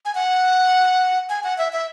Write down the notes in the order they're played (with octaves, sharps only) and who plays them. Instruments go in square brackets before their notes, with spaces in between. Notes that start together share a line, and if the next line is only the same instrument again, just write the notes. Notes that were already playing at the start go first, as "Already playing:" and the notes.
[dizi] G#5
F#5
G#5
F#5
E5
E5